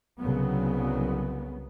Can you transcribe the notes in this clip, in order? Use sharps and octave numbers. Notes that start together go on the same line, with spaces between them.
C2 C#3 F#3 B3